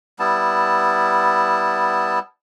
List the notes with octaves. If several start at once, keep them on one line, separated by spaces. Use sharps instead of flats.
G3 B3 E4 A5